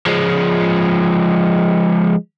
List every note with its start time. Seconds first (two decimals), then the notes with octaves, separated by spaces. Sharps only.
0.06 F3 G#3